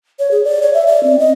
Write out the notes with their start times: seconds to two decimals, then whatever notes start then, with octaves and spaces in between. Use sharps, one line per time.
0.19 C#5
0.31 G#4
0.44 D5
0.62 C#5
0.74 E5
0.87 D5
1.03 C4
1.19 D#5